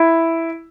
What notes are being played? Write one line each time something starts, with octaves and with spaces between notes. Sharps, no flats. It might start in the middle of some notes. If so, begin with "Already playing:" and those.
Already playing: E4